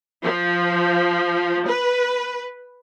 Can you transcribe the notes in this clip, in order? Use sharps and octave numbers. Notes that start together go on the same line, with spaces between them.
F3
B4